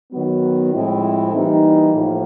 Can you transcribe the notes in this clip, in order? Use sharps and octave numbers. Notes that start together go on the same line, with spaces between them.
D#3 F#3 B3
A2 F3 G#3 C4 E4
E3 G3 A#3 D#4
A2 F3 A#3